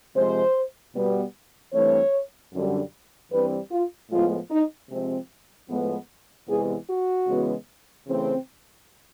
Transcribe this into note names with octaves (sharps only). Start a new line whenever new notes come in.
C3 F3 G#3 C5
B2 G3 B3
G2 E3 A3 C4 C#5
F#2 D3 G3
G2 E3 G3 C4 B4
F4
A2 F3 G#3 B3 F4
D#4
C3 F3 G#3 C4
A2 F3 G#3 B3
E2 C3 E3 G#3 B3 G#4
F#4
C#3 E3 G#3 B3
C#3 E3 A3 C4